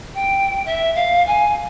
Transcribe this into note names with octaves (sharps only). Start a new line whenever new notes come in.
G5
E5
F5
G#5